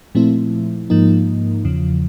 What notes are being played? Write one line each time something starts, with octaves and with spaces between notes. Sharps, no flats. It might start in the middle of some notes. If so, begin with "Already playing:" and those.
A#2 F3 A3 C4 E4
G#2 F3 A#3 D#4
E2 C#3 F3